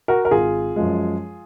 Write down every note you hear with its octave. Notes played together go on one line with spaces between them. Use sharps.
F#4 A#4
A#4
G#1 F4 G#4
F#2 F3 G#3